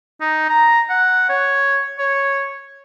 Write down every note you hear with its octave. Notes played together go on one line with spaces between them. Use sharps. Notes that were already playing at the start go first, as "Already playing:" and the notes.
D#4
A#5
F#5
C#5
C#5